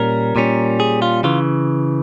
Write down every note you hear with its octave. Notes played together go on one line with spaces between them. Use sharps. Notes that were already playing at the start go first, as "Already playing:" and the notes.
Already playing: A#2 G3 C#4 A#4
A#2 G3 C#4
G#4
F4
C#3 E3 F4